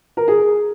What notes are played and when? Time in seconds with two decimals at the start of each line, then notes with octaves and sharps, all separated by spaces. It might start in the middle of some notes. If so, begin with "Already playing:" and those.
0.17 A#4
0.28 G#4